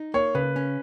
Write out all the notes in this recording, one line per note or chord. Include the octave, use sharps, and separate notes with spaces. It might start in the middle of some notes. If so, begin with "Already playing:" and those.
Already playing: D#4
A#3 C#5
C#3 B4
C#4